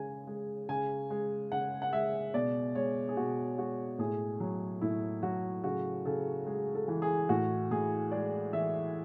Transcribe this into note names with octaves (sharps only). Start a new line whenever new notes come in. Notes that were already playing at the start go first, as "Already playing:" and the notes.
Already playing: C#3 G#3 G#5
G#3
C#3 G#5
G#3
C#3 F#5
F#5
G#3 E5
B2 D5
G#3 C#5
G#4
B2 F#4
G#3 F#4
A2 G#4
F#3
A2 E4
F#3 F#4
C#3 F#4
C#3 A4
G#3
A4
E3
G#4
A2 F#4
A2 G#4
G#3 D5
E3 E5